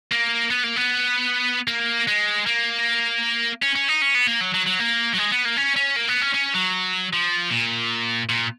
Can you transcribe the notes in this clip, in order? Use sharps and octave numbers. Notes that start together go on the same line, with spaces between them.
A#3
B3
A#3
B3
A#3
G#3
A#3
C#4
C#4
D#4
C#4
B3
A#3
F#3
F#3
F#3
A#3
F#3
G#3
B3
A#3
C#4
C#4
A#3
B3
C#4
C#4
F#3
F3
A#2
A#2